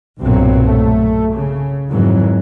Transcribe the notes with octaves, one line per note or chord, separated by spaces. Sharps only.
B1 G2 A#2 F#3 A#3 C4
A3
C#3
F2 G#2 D#3 E3 F#3